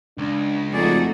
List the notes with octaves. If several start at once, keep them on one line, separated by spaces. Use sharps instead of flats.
C#2 D4
F2 A3 D#4 F#4 G#4 D5